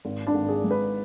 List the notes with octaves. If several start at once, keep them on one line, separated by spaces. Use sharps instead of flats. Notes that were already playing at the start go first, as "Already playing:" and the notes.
G#1
D4 D5
G#1
G#4
G#2
B4